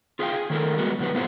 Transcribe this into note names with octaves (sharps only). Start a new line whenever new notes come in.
F4 G#4 A#4 E5 F5 G5
G#4
D#3 A3 E4 A4 A#4
G3 G#3 B3 F#4
F#2 B2 E3 G4 B4
G3 B3 E4 F4 A4 C5